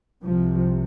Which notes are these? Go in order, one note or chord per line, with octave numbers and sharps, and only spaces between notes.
C2 C3 F3